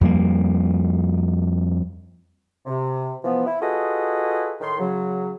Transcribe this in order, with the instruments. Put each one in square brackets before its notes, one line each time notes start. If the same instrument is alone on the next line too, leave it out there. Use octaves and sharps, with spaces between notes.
[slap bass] F2 G3 A3 A#3
[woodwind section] C3
E3 F3 B3
E4
F4 F#4 G#4 A4 B4 D#5
A2 D#3 C6
C#3 F#3